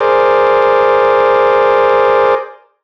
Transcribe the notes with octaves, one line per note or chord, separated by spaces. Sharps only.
G#4 A#4 C5 D5